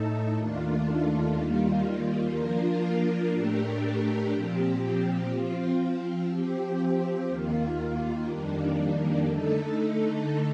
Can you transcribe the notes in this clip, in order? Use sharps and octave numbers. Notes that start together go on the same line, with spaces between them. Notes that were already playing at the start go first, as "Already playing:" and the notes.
Already playing: A2 A3 D#4 A4
D#2 D#3 A3 D4 F4
D#2 D#3 G3 A#3 F4
F3 A#3 D4 F4 A#4
A2 A3 D4 G4 A#4
A#2 F3 C4 G4
F3 C4 F4
F3 C4 G4
D#2 D#3 A#3 F4
F2 D#3 G3 A#3 D4
D3 A3 D#4 A4